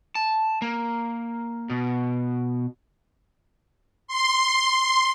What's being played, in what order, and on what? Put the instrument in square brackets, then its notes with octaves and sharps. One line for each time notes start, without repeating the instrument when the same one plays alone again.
[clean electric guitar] A5
A#3
B2
[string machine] C6